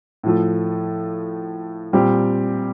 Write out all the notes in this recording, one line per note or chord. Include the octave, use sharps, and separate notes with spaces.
A2 F3 A3
A#2 G3 C4 G4